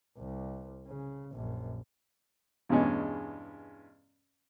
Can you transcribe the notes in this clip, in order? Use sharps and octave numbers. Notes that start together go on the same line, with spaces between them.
C2
C#3
A#1 F#2
E2 G2 B2 G#3 C#4